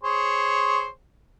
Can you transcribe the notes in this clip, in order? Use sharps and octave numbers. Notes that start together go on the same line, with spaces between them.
G#4 C5 C#5